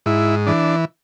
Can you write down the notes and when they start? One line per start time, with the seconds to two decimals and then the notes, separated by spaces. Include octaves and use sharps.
0.06 G#2 E4
0.47 E3 D4